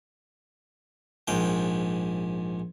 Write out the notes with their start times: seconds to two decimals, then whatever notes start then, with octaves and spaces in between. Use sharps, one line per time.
1.28 A#1 G#2 G5